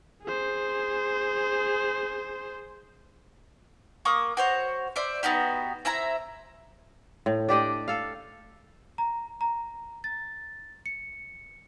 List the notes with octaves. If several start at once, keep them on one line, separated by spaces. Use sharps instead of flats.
G#4 C5
A#3 C#6 D#6
F#4 C5 C#5
C5 D5 E5
B3 D#4 F#4 G4
C4 E4 E5 A#5
A2
D4 G4 D5 D#5
A4 F5
A#5
A#5
A6
C#7